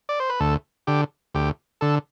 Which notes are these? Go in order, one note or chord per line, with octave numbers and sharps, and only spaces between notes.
D5
C5
B4
D2 A4
D3 G4
D2 G4
D3 A4